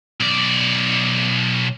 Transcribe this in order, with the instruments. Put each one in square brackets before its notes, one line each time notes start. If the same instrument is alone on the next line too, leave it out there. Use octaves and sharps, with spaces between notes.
[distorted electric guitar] B1 D5